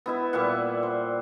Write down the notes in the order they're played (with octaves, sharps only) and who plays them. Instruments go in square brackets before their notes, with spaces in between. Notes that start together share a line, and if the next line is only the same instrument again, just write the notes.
[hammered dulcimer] B3 E4 E5
A#2 G3 E5 F#5
C5